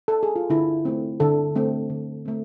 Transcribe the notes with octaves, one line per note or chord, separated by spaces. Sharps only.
A4
G#4
F4
D3 E4
A3 C4
D3 A4
A3 C4
D3
A3 C4